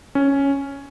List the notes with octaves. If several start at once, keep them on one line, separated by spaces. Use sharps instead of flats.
C#4